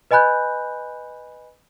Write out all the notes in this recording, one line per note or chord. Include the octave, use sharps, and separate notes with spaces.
B4 D#5 G#5 B5 F#6 G6